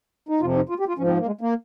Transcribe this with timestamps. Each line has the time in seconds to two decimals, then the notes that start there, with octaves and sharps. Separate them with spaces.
0.29 D#4
0.40 F2 C3 F3 F4
0.55 D#4
0.69 F4
0.80 G4
0.88 F4
0.98 G#2 F3 C#4
1.07 C4
1.19 A#3
1.26 G#3
1.41 A#3